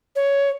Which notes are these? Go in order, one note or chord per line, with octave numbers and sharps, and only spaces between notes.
C#5